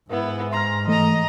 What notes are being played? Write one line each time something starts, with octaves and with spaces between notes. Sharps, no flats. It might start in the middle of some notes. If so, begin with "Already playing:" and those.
G#2 B3 E4
A#5 C6 F6
E3 A3 D#5 A#5